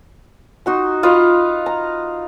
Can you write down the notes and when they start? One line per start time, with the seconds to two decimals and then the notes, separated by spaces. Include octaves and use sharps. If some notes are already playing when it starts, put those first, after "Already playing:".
0.66 D#4 F#4 C6
1.03 F4 B4 D#5 F5
1.66 A#5